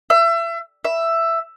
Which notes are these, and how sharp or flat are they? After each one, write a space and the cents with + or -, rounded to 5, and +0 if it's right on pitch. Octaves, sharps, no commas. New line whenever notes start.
E5 +30
E5 +10